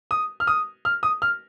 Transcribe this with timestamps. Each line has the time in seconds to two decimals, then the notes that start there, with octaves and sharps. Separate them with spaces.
0.11 D#6
0.40 F6
0.47 D#6
0.85 F6
1.03 D#6
1.22 F6